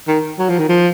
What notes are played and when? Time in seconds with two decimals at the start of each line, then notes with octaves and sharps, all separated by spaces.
0.08 D#3
0.39 F#3
0.49 F3
0.59 D#3
0.69 F3